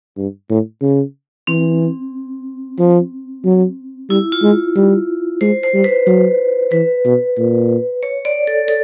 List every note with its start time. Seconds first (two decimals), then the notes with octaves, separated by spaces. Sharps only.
0.17 G2
0.50 A2
0.82 C#3
1.47 E3 C4
2.79 F3
3.45 F#3
4.09 G3 E4
4.32 F4
4.43 G#3
4.76 G3
5.41 G#3 C5
5.63 C5
5.74 G3
5.84 B4
6.07 F#3
6.72 E3 B4
7.05 B2
7.38 A#2
8.03 C#5
8.25 D5
8.47 A4
8.68 A4